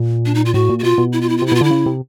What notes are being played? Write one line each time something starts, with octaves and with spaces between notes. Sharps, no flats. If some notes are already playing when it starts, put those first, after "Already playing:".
Already playing: A#2
D4
D#4
F4
A2 F#4
A#2
F#4
B2 F4
B2
E4
F4
E4
F4
C3 E4
B2 F4
D3 E4
C#3
C3